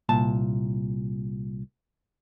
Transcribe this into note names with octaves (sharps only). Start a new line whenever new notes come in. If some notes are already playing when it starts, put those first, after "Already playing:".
C2 A#2 A5